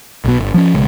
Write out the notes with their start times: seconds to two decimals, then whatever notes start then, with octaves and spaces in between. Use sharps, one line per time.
0.25 B1 B2
0.39 G1
0.54 F3 F#3 C#4
0.74 B1 C#3 G#3